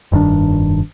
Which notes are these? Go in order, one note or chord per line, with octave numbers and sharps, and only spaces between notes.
F1 G2 D#3 D4